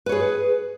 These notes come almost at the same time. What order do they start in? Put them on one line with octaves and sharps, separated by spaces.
B4 C#5 G#4